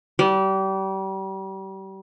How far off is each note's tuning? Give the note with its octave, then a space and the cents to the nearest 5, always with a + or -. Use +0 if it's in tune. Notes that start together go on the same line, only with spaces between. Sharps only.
G3 -30